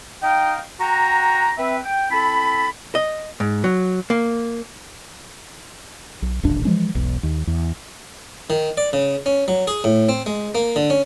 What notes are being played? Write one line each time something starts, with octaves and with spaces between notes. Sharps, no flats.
D#4 D#5 F5 G5
F#4 F#5 G5 A#5
C4 B4 E5
G5
C4 E4 A4 A5 B5
D#5
G#2
F#3
A#3
B1
D#1 A1 D2 D4
E3 F3 G#3 C#4
E1 B1
D#2
E2
D#3
D5
C#3
C#4
F#3
G#4
A2
C4
G#3
A#3
D3
C#4